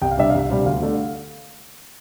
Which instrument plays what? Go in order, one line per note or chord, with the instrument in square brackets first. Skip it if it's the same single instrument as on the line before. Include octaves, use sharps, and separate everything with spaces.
[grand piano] C2 G5
F5
C3 G3 D4 E5
C2 F5
C3 G3 D4
D2 F5
D3 A3 D4